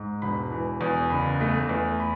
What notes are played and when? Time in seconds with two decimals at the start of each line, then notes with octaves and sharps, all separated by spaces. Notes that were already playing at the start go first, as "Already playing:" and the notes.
Already playing: G#2
0.22 E1 B5
0.51 E3
0.81 E2
1.10 F#1 B5
1.41 A3
1.69 E2
2.00 B5